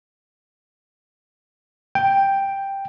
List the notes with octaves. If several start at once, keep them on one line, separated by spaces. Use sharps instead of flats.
G5